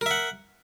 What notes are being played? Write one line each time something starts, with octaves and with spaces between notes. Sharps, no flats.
A#4 E5 F#5